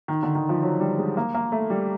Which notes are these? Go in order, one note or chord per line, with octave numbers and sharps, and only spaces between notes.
D#3
D3
D#3
F3
F#3
G3
G#3
A#3
A#3
A3
G3